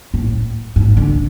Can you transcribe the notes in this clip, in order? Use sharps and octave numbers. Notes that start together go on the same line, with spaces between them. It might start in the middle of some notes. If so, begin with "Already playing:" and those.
A2
G#2
D3